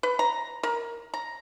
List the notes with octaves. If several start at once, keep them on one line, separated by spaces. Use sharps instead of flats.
B4
A#5
A#4
A#5